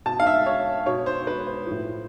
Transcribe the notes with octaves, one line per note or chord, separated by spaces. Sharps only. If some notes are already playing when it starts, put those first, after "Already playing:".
B2 A5
F5
E5
C#5
B2 C#5
C5
B4
C5
A2 F3